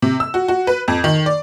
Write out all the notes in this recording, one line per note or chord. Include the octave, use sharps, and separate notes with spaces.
C3
E6
F#4
F#4
B4
F2
D#3
D5